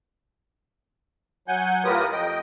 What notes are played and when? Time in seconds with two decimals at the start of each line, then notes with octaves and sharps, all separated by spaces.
1.48 F#3 F#5 G#5 G6
1.85 A2 F4 G4 A#4 B4 D#6
2.12 F2 D#5 G5